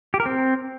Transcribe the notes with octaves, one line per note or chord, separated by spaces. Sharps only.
G4
A#4
C4